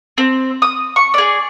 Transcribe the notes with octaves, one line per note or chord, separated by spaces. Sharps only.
C4
D#6
C#6
G#4 D5